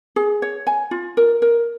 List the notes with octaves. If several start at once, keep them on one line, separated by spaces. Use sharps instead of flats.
G#4
C#5
G#5
F4
A#4
A#4